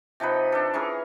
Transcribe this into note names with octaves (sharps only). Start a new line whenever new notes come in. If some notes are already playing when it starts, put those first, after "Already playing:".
C3 F3 D#4 B4
D4 A4
E3 C#4 G#4 A#4